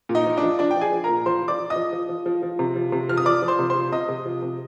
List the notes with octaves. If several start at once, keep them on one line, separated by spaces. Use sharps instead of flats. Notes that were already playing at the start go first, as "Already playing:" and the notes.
A#2
D#4 D#5
F3
D4 D5
F3
F3 D4 D5
G5
F3
G#4 G#5
F3
A#4 A#5
A#2
F3 C5 C6
F3
D5 D6
F3
D#5 D#6
F3
F3
F3
F3
F3
C3
F3
C3
F3 F6
D#6
F3 D5 D6
F3
C5 C6
C3
C5 C6
F3
C3 D#5 D#6
C3
F3
C3